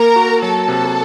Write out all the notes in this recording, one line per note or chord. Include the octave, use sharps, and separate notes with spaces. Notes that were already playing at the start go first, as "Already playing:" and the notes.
Already playing: A#3 A#4 A#5
F#4
F#3 A4 A5
C3